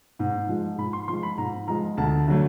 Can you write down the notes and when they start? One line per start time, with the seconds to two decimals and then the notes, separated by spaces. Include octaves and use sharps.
0.19 G#2
0.48 F3 G#3
0.78 G#2 B5
0.93 C6
1.08 F3 G#3 C6
1.23 B5
1.38 G#2 A#5
1.68 F3 G#3 A#5
1.97 D2 A5
2.27 D3 F#3 A3